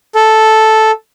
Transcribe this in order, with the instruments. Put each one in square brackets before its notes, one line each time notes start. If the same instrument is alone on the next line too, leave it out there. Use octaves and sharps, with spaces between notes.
[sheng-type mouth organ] A4